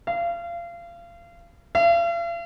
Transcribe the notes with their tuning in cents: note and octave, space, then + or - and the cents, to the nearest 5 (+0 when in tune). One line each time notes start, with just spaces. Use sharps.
F5 -30
F5 -45